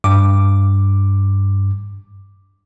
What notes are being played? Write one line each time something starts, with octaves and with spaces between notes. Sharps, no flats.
G2 D6